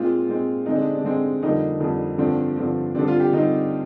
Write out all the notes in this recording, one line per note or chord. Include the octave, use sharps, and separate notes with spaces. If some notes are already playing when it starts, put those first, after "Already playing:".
Already playing: A#2 G#3 C4 F4
A#2 G#3 C4
D3 G#3 C4 D#4
D4
D4
D3 G#3 C4
F2 D3 G3 A#3 D#4
F2 D3 G3 A#3
G2 D3 F3 C4 D4
G2 D3 F3 C4
D3 G3 C4 D4
F4
G4
D3 G3 C4 D#4